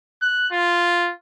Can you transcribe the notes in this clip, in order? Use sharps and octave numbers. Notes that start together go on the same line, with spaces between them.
F#6
F4